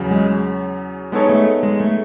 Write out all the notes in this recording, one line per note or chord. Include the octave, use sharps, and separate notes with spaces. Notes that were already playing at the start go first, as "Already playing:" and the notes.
Already playing: E2 C#3 F#3
G#3
G#3 B3 D#4 A4 C#5
A3
G#3
A3